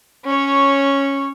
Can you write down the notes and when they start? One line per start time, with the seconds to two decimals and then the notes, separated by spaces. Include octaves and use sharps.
0.25 C#4 C#5